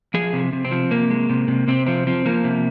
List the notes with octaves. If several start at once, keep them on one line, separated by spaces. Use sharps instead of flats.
F3 G#4
C3
C3
C4
F3
C3 A#3
G#3
C3
C3
C3 C4
F3 C4
F3 C4
F3 A#3
C3